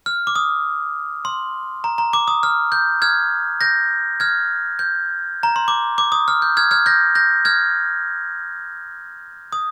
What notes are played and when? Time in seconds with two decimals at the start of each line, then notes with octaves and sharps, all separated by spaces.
0.06 F6
0.27 D6
0.35 D#6
1.25 C6
1.84 A#5
1.98 A#5
2.13 D6
2.28 D#6
2.43 F6
2.72 G6
3.02 F6 G#6
3.61 G6 A#6
4.20 F6 G#6
4.79 G6
5.43 A#5
5.56 C6
5.68 D6
5.98 D6
6.12 D#6
6.28 F6
6.42 G6
6.57 F6 G#6
6.71 F6 G#6
6.86 G6 A#6
7.15 G6 A#6
7.45 F6 G#6
9.52 D#6